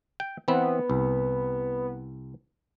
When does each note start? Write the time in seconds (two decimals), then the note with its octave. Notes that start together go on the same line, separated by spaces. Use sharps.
0.20 G5
0.48 E3 B3 C4
0.90 C2